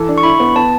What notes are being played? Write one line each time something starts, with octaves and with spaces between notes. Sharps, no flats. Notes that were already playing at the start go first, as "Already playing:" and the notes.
Already playing: E3 A4
D4
C#6
E4 B5
B3
B3 A5